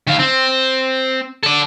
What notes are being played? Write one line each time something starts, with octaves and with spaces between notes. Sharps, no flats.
D#3 F5
C4
A4 D5